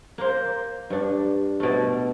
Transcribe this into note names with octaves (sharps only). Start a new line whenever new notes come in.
A#3 C5
G2 D4
B2 A3